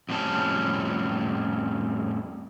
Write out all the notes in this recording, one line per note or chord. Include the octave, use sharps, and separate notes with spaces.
F2 A2 G3 C#4 A5